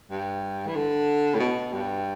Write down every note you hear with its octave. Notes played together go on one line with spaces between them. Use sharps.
G2
E3
D3
A2
B2
G2